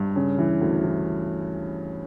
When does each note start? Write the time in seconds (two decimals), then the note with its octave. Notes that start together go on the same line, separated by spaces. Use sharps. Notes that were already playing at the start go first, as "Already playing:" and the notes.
Already playing: G2
0.16 C#3
0.38 E3
0.61 D2
0.84 E3